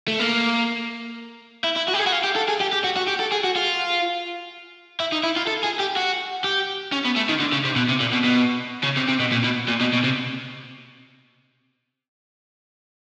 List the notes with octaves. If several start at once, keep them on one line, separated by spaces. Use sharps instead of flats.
A3
A#3
E4
E4
F#4
G4
G#4
F#4
F4
G4
A4
G#4
G4
G4
F#4
F#4
G4
A4
G#4
F#4
F4
E4
D#4
E4
F4
A4
G#4
G4
F#4
G4
C#4
B3
A3
D#3
D3
C#3
C3
B2
C3
A#2
B2
B2
C#3
C3
C3
B2
A#2
B2
A#2
B2
B2
C3